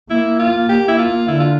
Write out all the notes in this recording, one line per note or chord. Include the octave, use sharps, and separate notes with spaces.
A#3 E4
F4
A#3 G4
E4
F4
D3 E4
F4